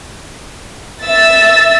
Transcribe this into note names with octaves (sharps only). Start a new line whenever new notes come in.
E5 E6 A6